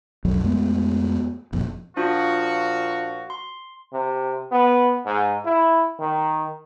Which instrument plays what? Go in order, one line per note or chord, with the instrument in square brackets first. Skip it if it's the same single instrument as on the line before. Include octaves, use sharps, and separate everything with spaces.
[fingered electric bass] B1 F2 F#3
F2 G#3 A3 B3
F#1 F2 A#2
[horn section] A#2 F3 F#4 [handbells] D4 F4
[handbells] C6
[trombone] C3
B3
G#2
E4
D#3